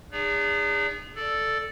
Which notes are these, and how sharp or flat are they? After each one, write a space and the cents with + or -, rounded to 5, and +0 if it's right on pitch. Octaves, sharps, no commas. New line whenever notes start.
D#4 -45 G#4 -25 D5 -40
A4 +0 D5 +0